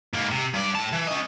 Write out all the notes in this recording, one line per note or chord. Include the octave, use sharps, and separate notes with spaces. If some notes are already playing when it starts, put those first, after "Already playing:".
G#2 A#3
C3
G2 D5
A2 A5
E3
C#4 D#5